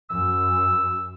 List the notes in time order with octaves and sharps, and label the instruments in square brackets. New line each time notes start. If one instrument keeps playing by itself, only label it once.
[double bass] F#2 [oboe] E6